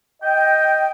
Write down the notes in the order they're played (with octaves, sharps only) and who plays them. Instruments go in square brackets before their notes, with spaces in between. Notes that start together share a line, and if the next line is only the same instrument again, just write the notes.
[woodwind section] D#5 G5